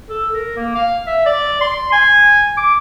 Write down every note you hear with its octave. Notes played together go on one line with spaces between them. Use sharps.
A4
A#4
A#3
F5
E5
D5
C6
G#5
D6